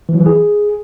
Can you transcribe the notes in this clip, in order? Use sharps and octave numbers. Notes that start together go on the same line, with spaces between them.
E3
F#3
E3
G#4